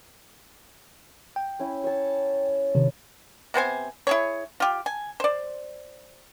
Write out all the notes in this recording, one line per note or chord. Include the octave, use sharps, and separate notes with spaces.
G5
C#4 E4
C#5 A5
C3 D#3
C3 B3 C5 G#5
E4 G#4 C#5
F4 G4
G#5
C5 D5